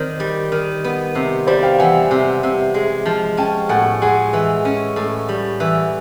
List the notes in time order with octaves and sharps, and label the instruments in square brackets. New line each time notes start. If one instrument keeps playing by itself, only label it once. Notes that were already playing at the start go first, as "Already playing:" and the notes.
Already playing: [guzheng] D#3 C4 [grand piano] C5 D5
[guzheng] G3
D#3
B3
C3
[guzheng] G3 [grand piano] C5 D5
[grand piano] F5 G5
[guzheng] E3 [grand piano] F#5 G#5
[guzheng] C3
C3
G#3
F3
[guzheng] C#4 [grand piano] G5 A5
[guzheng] A2 [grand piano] F#5 G#5
[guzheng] G#3 [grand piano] F#5 G#5
[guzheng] E3
C#4
A2
G3
E3